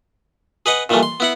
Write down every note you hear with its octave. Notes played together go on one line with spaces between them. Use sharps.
G#4 B4 D#5 F#5
A#2 D#3 E3 G3 A3
C6
B3 E4 F#5